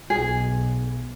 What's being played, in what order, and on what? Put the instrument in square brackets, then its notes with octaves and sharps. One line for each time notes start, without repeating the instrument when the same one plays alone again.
[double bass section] B1 [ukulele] G#4